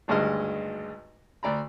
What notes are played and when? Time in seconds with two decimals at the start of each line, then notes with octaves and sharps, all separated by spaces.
0.08 G#1 D2 G2 G#3 D#5 F6
1.43 D2 D5 A#5 B5